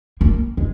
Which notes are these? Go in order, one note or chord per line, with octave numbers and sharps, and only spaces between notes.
A#3
G#3